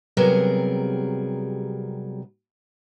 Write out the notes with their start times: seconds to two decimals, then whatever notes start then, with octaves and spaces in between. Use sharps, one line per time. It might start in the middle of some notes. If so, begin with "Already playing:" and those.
0.17 C3 F#3 G3 B3 G#4 A#4